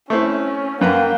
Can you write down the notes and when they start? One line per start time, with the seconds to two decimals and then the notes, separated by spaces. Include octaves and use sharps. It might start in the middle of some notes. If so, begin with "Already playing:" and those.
0.10 A3 C4 C#4 E4
0.81 F#2 A#3 B4 G5 A#5